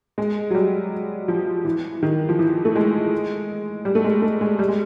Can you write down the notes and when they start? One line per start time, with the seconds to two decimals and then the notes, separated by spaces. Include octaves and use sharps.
0.18 G#3
0.50 F#3
0.55 G3
1.28 F3
1.65 E3
2.03 D#3
2.29 F3
2.39 E3
2.65 A3
2.76 G#3
3.85 G3
3.95 A3
4.04 G#3
4.22 A3
4.41 G#3
4.59 G3
4.68 G#3